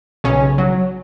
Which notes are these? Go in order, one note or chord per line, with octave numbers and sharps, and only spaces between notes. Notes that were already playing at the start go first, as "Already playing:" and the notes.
B1 C#3 C#4
F#3